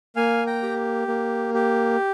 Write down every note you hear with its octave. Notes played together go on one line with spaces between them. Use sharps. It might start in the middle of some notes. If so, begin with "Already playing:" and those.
A#3 F5 G#5
G5 A#5
G4
A#3
G4